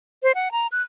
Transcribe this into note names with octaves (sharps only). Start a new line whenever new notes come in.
C5
F#5
A#5
F#6